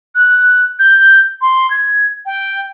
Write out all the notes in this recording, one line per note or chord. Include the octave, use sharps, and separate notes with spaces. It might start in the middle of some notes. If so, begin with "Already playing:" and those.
F#6
G6
C6
G#6
G5